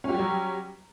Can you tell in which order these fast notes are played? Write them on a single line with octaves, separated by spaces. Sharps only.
C#4 G4 G3 F#3